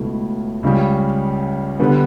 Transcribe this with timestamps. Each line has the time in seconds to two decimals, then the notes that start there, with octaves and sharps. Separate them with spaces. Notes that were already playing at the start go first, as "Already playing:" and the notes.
Already playing: C#2 B2 A3 E4
0.63 C#2 C#3 G3
1.80 D3 G3 B3